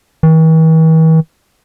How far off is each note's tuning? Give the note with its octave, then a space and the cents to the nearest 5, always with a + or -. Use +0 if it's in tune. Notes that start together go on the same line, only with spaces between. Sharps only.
E3 -45